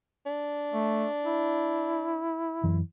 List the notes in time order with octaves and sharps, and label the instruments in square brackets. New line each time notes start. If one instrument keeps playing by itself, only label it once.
[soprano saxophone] D4
[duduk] A3
E4
[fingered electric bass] F#2 E3